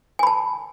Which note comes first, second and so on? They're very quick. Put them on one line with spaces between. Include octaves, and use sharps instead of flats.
G#5 B5 A5